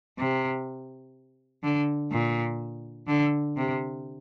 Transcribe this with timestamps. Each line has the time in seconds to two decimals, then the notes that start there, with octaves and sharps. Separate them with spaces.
0.18 C3
1.64 D3
2.12 A#2
3.08 D3
3.57 C3